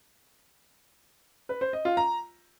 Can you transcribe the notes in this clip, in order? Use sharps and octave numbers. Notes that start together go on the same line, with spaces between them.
B4
C5
D#5
F4
A#5